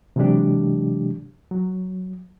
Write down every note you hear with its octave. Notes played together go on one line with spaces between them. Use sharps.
C3 E3 F#3 G#3 D4 G4
F#3